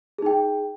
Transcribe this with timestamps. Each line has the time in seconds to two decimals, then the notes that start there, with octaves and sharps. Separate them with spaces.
0.18 G#4
0.22 D#4
0.26 G5